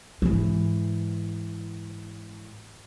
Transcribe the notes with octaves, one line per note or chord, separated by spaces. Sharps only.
G#2 E3